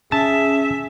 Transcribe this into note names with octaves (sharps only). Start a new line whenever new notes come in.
C#4 G#4 E5 A5